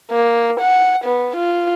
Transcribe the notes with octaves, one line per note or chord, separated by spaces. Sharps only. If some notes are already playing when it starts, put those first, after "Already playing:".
A#3
F#5
B3
F4